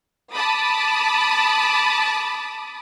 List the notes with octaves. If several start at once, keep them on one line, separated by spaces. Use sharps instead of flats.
A5 B5 D6 D#6